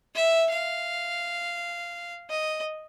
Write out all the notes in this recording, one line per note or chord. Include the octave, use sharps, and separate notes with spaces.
E5
F5
D#5